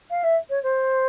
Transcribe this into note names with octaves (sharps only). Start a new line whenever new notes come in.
F5
E5
C#5
C5